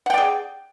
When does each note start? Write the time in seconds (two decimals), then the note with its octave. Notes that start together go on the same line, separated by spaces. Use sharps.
0.06 F#5
0.10 G5
0.14 D5
0.18 G#4